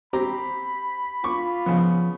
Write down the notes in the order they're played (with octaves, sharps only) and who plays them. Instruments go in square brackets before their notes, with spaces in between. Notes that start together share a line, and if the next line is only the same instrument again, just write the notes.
[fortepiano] C4 G4 A#5 [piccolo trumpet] B5
[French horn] F4 [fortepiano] C#6 D6
[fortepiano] C#3 B3 [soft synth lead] F3